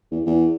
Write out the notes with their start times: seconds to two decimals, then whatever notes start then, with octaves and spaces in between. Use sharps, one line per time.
0.11 E2
0.26 E2